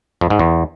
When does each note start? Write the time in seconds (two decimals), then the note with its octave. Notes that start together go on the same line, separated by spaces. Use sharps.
0.21 F2
0.30 G#2
0.39 E2